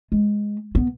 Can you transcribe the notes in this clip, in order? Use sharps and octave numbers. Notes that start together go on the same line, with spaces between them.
G#3
B3